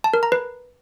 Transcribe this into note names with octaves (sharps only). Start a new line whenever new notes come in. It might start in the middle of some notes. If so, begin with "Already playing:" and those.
A5
A#4
A#5
B4